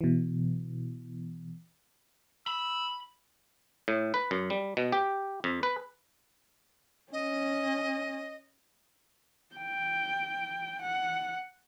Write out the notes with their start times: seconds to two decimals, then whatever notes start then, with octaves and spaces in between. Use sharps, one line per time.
0.01 B2 E3
2.47 B5 E6
3.88 A2
4.14 B4
4.31 F#2
4.50 G3
4.77 B2
4.92 G4
5.44 F2
5.63 B4
7.13 C#4 D#5
9.56 G5
10.82 F#5